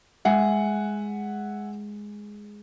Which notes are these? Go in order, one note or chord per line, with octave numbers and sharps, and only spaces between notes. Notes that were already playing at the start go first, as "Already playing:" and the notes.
G#3 E5 F#5 G#5